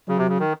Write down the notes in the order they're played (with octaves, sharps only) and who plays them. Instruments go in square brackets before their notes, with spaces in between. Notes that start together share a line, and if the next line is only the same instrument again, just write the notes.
[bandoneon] C#3 [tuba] F#3
[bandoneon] C3
C#3
D#3